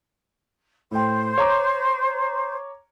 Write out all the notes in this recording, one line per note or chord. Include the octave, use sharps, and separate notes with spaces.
A2 C5 G5
C#5 A#5 D6